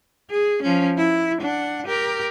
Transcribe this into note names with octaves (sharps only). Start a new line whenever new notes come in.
G#4
F3 C#4
E4
D4 F#5
G4 A#4